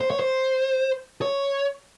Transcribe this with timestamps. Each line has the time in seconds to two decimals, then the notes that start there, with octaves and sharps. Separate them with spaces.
0.01 C5
0.11 C#5
0.19 C5
1.22 C#5